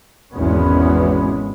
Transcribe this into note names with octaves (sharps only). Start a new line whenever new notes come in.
G#1 E2 B2 G#3 B3 C#4